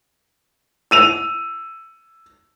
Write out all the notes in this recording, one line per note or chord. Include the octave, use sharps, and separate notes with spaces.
E6 D#7 F7